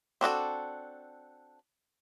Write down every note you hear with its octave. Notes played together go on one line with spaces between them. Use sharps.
C4 D4 F#4 A4